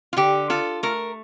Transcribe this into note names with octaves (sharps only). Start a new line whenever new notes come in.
F4
D3 G4
F4 A4
A3 A#4